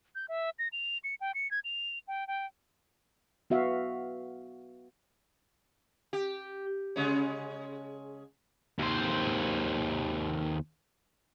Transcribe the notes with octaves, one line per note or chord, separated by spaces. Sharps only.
G6
E5
A#6
F7
C#7
G5
C#7
G#6
F7
G5
G5
B3 F#4 E5 F5
G4
C#3 G#3 C#4
D#2 C5